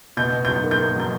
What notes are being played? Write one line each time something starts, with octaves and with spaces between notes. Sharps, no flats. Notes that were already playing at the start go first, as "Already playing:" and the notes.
B2 G6
B2
B1 G6
A#3
G6
A#3
F#3 G6